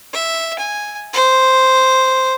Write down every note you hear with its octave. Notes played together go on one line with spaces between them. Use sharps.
E5
G#5
C5